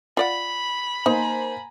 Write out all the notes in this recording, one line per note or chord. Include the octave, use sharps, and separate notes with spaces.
F4 D5 F#5 B5
A#3 D#4 C5 G#5 A#5